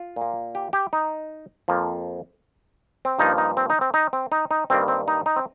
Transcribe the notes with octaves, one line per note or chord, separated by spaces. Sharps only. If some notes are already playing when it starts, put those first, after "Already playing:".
Already playing: F4
A#2 A#3
G4
G4
D#4
F2 F3 A#3
C4
G2 F3 A#3 D#4
D#4
C4
D#4
C4
D#4
C4
D#4
D#4
G2 D#3 G3 A#3 C4
C4
D#4
D#4
C4